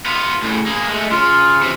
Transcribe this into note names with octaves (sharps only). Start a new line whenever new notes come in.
B3 F4
A2 C#3
A#3 G#4
G#3 A3
C#3 F4
C3 E3